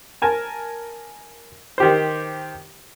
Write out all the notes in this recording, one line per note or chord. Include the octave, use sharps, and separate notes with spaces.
A#4 G#5 A5
D#3 G4 C5